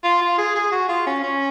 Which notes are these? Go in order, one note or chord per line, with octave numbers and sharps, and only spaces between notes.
F4
F4
G#4
G#4
F#4
F4
C#4
C#4